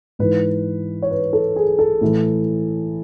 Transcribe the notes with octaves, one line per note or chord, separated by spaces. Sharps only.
G#2 E3 B4
C#5
B4
A4
G#4
A4
A2 E3